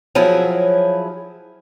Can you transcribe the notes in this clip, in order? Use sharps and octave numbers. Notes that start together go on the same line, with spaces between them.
F3 F#3 E4 G#4